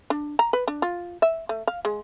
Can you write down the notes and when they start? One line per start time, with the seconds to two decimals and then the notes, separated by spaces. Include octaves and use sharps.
0.10 D4
0.39 A#5
0.53 B4
0.68 D4
0.82 F4
1.22 E5
1.49 A3
1.68 F5
1.85 G#3